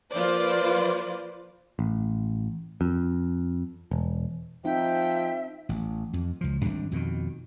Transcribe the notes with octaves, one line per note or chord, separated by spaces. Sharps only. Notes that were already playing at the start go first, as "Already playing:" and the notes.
F3 A#3 F4 B4 C5 D5
A1
F2
E1
F3 C4 D#4 E5 G5
A1
F2
C#2 F3
G#1 G2 G3 D4
F2 B2 D3 D#3